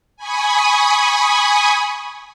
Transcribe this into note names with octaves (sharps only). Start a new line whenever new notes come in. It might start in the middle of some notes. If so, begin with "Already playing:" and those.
G#5 B5 C#6 D#6